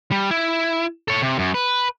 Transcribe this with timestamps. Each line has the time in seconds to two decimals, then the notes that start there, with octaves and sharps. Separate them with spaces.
0.11 G3
0.31 E4
1.08 A4 C#5
1.22 C3
1.39 F#2
1.54 B4